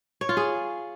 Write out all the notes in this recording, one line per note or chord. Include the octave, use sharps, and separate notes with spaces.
C#5
F4
G#4